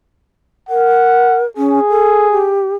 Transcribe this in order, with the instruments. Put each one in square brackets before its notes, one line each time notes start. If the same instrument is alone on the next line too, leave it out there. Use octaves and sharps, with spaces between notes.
[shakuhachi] A#4 [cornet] F#5
[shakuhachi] C#4 [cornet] G#4
[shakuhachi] A4
G4